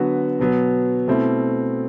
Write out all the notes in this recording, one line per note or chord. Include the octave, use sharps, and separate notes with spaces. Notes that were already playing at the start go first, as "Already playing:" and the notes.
Already playing: D3 F#3 B3 F#4 B4
B2 F#3 B3
B2 A3 C4 E4